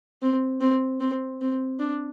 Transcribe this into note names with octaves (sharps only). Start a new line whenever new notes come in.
C4
C4
C4
C4
D4